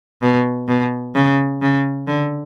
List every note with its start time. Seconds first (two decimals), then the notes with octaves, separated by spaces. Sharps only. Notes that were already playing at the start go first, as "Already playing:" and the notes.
0.22 B2
0.68 B2
1.15 C#3
1.62 C#3
2.07 D3